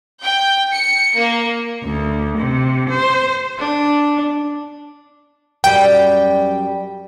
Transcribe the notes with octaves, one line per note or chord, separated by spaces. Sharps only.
G5
C#7
A#3
D2
C3
C5
D4
F#2 G3 G5